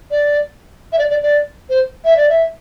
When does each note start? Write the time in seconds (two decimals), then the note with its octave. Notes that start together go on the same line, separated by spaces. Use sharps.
0.11 D5
0.93 E5
0.99 D5
1.10 D5
1.23 D5
1.69 C5
2.05 E5
2.17 D5
2.29 E5